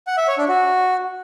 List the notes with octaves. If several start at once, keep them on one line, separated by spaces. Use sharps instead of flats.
F#5
E5
C#5
D4
F#4